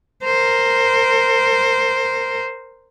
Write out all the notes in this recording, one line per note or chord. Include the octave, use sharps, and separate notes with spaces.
A#4 C5